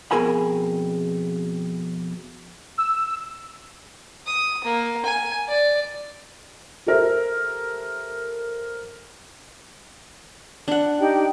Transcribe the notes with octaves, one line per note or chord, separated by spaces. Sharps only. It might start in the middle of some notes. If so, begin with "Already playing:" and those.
F2 B2 G#4 A#4 G#5 B5
E6
D#6
A#3
G#5
D5
G4 A4 A#4 C5 E5
D4 F#5
D#4 G4 G5